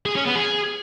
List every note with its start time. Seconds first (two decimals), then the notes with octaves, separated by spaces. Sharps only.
0.06 G#4
0.16 C#4
0.26 B3
0.36 G#4